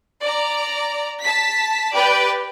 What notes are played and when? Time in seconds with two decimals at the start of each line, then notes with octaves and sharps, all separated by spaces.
0.21 D5 A#5
1.21 A5 B6
1.92 G4 B4 D5 G5